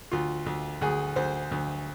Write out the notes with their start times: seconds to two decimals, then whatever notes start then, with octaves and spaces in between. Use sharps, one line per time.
0.12 D2 F4
0.46 D2
0.81 D2 G#4
1.16 D2 C5
1.52 D2